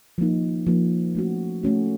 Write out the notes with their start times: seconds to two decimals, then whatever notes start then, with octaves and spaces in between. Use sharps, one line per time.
0.18 F3 A#3 D#4
0.67 F3 A#3 D#4
1.15 A3 C#4 F#4
1.63 A3 C#4 F#4